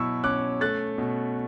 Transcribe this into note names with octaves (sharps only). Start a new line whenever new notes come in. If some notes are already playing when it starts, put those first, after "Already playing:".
Already playing: B2 F#3 E4 C#6 E6
C#4 D6 F#6
A3 F#6 A6
B2